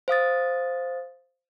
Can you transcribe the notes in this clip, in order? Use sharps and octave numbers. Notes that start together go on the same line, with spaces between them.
C5 F5 D#6 A6